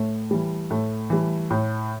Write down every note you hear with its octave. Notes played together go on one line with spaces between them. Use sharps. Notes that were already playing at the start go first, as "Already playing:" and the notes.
Already playing: A2 A3
E3 G3
A2 A3
E3 G3
A2